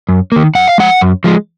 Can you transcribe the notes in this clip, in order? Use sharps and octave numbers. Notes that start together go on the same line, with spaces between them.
F#2
D#3 A#3
F#2 F#5
F5
F3 G#3 F#5
F#2
F3 G#3